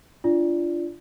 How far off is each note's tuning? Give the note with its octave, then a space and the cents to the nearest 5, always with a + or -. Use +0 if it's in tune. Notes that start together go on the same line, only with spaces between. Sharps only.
D4 +0 F4 -20 D5 -5